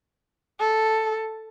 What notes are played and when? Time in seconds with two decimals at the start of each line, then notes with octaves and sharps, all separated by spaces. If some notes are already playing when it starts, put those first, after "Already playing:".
0.60 A4